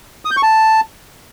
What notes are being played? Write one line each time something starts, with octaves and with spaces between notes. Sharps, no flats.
D#6
G6
C#6
A5